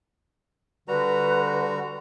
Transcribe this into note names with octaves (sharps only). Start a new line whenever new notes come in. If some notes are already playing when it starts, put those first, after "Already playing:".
D3 G3 F#4 B4 A#5